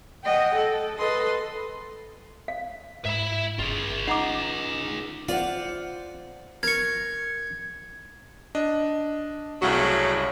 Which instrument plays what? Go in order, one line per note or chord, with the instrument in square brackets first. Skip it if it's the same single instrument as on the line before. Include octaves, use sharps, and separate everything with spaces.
[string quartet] D#5 F#5 G5
A4
A4 B4 D#5 C6
[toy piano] F5
[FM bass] G#2 [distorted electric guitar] E5 B5
[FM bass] G1 [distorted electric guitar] F4 G#4
[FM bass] D#4 [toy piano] F#5 A#5 D6
[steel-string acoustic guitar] F4 C5 F#5 [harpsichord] D5
[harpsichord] A#4 C#6 [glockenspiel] G#6
[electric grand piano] D4 D#5
[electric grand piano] C2 F#4 [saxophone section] A2 C#3 F#3